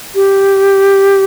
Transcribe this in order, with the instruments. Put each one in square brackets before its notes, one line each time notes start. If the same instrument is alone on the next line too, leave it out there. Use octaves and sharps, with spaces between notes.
[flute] G4